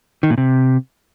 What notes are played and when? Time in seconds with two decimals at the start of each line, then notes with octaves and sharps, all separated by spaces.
0.23 D#3
0.30 A#2
0.38 C3